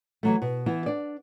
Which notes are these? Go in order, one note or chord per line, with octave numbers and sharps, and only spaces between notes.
E3 F#3 A3
B2
E3 B3 E4
D4 D5